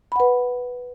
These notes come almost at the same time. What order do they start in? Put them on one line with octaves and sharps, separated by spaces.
B5 F#5 B4